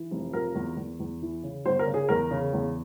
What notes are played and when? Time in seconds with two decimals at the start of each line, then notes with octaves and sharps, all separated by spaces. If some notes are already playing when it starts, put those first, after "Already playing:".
Already playing: E3
0.11 F1
0.33 F3 A#4
0.55 E2
0.77 E2
1.00 E2
1.22 E3
1.43 C#3
1.65 G1 C5
1.79 A#4
1.87 C#3
1.94 G#4
2.09 E2 A#4
2.31 C#3
2.53 E2